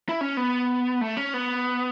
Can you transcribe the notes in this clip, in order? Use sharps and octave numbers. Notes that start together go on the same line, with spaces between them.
E4
C#4
B3
A3
C#4
B3